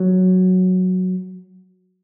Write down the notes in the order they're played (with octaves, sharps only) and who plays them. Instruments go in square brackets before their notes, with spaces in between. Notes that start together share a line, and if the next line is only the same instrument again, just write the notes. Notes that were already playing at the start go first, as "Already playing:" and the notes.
Already playing: [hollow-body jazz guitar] F#3